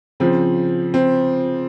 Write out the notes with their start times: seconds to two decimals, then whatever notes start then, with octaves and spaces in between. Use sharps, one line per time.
0.20 C#3 F3 C4
0.94 C4